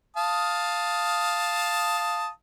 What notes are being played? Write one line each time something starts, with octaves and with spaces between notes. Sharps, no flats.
F5 A5 D#6